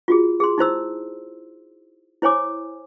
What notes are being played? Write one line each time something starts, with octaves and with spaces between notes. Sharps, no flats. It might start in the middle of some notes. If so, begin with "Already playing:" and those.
F4 F#4 G#4
G#4 C6
D#4 E4 C5 E6
E4 C5 C#5 G#5 D6